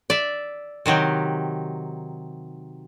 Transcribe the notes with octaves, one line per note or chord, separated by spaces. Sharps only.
D5 E5
C3 D#3 F#3 G4